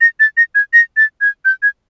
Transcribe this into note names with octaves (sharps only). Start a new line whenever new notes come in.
A#6
A6
A#6
G#6
A#6
A6
G#6
G6
G#6